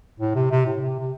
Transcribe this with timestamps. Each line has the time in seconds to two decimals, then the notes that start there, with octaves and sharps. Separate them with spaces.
0.19 A2
0.35 C3
0.51 C3
0.66 A2
0.81 C3
1.00 C3